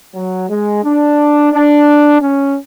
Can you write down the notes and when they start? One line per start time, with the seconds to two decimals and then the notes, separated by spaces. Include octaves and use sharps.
0.15 F#3
0.49 G#3
0.84 D4
1.53 D4
2.21 C#4